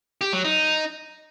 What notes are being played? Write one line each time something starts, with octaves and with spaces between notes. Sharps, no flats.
G4
F#3
D#4